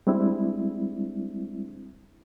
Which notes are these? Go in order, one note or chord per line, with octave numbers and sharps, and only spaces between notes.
G3 G#3 C4 D4 E4